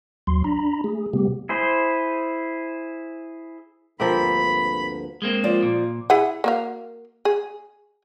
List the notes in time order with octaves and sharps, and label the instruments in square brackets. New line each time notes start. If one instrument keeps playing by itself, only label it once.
[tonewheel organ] D#2 F#3 C6
D4 A#5 B5
A3 G#4
C3 G3 A3 B3 G4
[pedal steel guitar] E4 G#4 C5
[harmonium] D2 G2 D3 [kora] F3 A#3 C4 [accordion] B5
[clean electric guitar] G#3 A#3 C4
[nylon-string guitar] F3 D5
[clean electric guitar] A#2
[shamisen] E4 G#4 F#5
A#3 F#4 F5
G#4